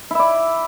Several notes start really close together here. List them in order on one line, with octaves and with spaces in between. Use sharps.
E4 E5 D5